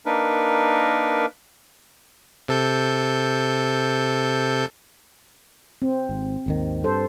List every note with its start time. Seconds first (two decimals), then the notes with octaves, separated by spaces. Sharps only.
0.06 A#3 D4 D#4 A#4 B4
2.48 C3 A4 G6
5.82 C4
6.09 G#1
6.46 G#1 D#2 D#3
6.84 G2 A4 C5